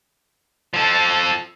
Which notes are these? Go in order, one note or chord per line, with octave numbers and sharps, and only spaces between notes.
F3 A4